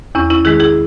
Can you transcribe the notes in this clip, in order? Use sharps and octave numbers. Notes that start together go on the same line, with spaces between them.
E2 C#4 E4
C#4 E4
D#3 G#3 E4 G#4
E4 G#4